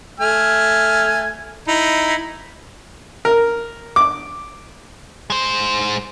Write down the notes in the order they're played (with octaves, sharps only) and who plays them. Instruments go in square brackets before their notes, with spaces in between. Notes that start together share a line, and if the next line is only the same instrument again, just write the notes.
[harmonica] A3 G#5 F6
D#4 E4
[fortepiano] A#4
D6
[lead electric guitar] G#3 C5